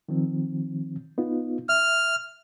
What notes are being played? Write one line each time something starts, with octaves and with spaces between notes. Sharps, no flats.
D#3 F3 C4
B3 D#4 F4
E5 F6